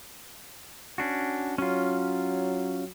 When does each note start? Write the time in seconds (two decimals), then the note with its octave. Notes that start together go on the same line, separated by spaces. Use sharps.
0.98 C#4 D4 F#4
1.58 F#3 C#4 F4